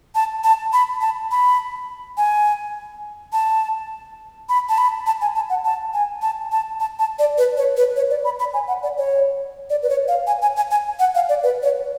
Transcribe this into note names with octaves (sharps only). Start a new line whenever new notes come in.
A5
A5
B5
A5
B5
G#5
A5
B5
A5
B5
A5
G#5
A5
F#5
A5
G#5
A5
A5
A5
A5
D5
B4
C#5
B4
C#5
D5
B5
B5
G#5
F#5
D5
C#5
D5
B4
C#5
F5
G#5
G#5
G#5
G#5
F#5
F5
D5
B4
C#5